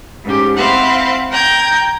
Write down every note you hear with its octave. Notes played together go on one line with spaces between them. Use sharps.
G#2 C#4 G4
C4 E4 C5 F5 F#5
G5 A#5 G6 G#6